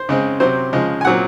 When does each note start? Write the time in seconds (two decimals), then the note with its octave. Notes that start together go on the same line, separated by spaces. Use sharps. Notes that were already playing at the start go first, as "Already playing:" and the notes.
Already playing: C5
0.09 C#3 G#3 C4
0.40 C3 F#3 C4 C5
0.73 C#3 F3 G#3
1.01 G#5
1.05 A#2 F#3 C4 F#5